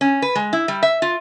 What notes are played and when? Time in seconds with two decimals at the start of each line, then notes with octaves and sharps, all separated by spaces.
0.01 C#4
0.22 B4
0.35 G#3
0.53 E4
0.68 G3
0.83 E5
1.02 F4